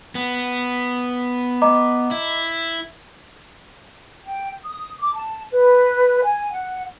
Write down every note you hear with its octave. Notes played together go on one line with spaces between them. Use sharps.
B3
D#5 A#5 D6
E4
G5
D#6
D6
A5
B4
G#5
F#5